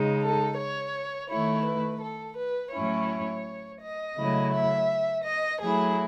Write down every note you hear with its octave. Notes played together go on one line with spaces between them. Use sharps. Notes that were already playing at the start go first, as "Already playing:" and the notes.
Already playing: C#3 G#3 D#4
A4
C#5
D#3 A3 E4 C#5
B4
A4
B4
A2 F#3 C#4 E4 C#5
D#5
C#3 F#3 A3 E4
E5
D#5
F#3 A3 E4 G#4